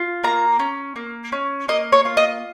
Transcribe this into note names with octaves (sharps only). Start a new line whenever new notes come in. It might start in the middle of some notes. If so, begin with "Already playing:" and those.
Already playing: F4
A#3 A#5
C#4
A#3
C#4
A#3 D#5
C#5
F4
D#5